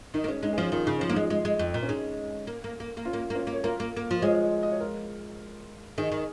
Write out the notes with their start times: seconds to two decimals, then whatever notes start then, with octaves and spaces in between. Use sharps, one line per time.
0.14 D#3 D#4
0.24 A#3
0.28 G#3 C#4
0.43 G#3 D#4
0.53 G#4
0.57 F3 C#4 F4
0.72 D#3 F4
0.85 C#3 D#4
0.98 F3 C#4
1.09 A#3
1.12 G#3 D#4
1.30 G#3
1.45 G#3
1.59 F2
1.74 A#2
1.82 C#4
1.89 G#3 D#4
2.47 A#3
2.64 A#3
2.80 A#3
2.97 A#3
3.05 C#4 F4
3.13 A#3
3.30 A#3
3.35 C#4 F4
3.47 A#3
3.53 C#5
3.64 A#3 F4 A#4
3.80 A#3
3.97 A#3
4.11 F3
4.22 G#3 G#4 C#5
4.63 D#5
4.71 C#5
4.80 F4 A#4
5.98 D#3 D#4 G#4
6.12 D#3